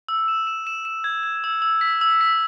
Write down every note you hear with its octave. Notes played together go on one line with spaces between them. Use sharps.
E6
E7
E7
E7
E7
G#6
G#6
E6
E6
B6
E6
B6